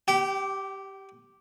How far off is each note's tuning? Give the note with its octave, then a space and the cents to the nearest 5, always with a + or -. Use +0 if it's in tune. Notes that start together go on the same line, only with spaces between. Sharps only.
G4 -5 G5 -35